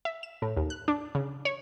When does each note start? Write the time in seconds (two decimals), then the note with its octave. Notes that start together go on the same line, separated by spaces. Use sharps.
0.05 E5
0.23 E7
0.42 A2
0.57 D#2
0.70 F#6
0.88 D4
1.15 C#3
1.45 C#5